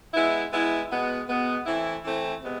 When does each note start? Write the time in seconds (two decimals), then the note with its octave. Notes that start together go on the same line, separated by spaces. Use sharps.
0.14 G#3 B3 E4
0.52 G#3 B3 E4
0.90 B2 G#3 B3
1.28 B2 G#3 B3
1.66 E3 A3 C4 E4
2.04 E3 A3 C4 E4
2.43 C3 G#3 B3